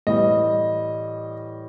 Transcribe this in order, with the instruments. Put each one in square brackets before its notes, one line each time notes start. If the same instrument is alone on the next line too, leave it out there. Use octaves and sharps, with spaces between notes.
[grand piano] A2 E3 G3 D#5